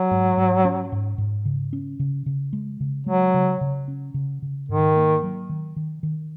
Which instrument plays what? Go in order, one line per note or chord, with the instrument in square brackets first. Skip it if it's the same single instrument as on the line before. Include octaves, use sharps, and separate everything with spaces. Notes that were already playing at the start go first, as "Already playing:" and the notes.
Already playing: [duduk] F#3
[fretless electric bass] G#2
G#2
C#4
G#2
G#2
C#3
C#4
C#3
C#3
G#3
C#3
[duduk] F#3 [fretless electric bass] G#3
[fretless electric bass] C#3
C#3
C#4
C#3
C#3
[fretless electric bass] G#2 [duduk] D#3
[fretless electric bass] A#3
F#3
D#3
D#3
D#3